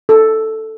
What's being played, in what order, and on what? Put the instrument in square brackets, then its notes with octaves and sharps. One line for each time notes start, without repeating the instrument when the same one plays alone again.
[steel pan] A4